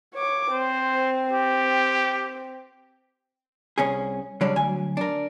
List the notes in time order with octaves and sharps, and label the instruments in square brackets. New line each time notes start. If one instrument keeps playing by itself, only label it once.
[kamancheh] C#5 D6
[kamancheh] C4 [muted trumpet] C5
[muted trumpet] G4
[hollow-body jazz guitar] C2 C#4 G#4
C#3 F#3 G3 C#4 D4
D2 F#3 G#5
D4 A#4